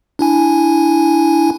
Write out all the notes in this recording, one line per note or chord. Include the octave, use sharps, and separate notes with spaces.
D4 E4 G#5